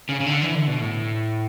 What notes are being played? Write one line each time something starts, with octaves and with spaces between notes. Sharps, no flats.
C#3
C#3
D3
E3
D3
B2
A2